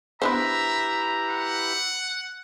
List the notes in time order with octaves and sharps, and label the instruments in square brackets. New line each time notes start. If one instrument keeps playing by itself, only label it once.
[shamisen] B3 D4 C5 [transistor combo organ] E4 G4 B4 [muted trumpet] E5 [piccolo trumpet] A#5
[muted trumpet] F#5